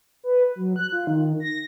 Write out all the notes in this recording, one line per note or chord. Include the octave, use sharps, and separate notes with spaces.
B4
F#3
F#6
F4
D#3
A#6